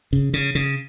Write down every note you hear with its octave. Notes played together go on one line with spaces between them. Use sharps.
C#3
C#3
C#3